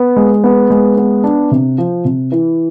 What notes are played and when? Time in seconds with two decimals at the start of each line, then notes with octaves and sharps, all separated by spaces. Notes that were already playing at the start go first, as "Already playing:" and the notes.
Already playing: B3
0.16 G#3
0.44 B3
0.70 G#3
0.97 B3
1.24 D4
1.52 C3
1.78 F3
2.05 C3
2.32 E3